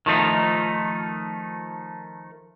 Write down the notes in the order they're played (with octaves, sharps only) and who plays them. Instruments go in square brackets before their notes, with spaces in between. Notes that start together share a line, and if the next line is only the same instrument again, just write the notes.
[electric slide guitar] D#3 F3 A3 D#4